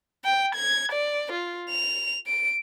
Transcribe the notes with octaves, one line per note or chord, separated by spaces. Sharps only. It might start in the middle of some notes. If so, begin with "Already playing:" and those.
G5
G#6
D5
F4
F7
D7